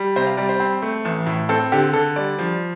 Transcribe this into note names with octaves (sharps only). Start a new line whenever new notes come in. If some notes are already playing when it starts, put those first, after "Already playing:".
Already playing: G3
C3 C5
F5
G3 D5
C5
C4
A3
A1
A2
C4 A4
D3 G4
D3 A4
G3 D5
F3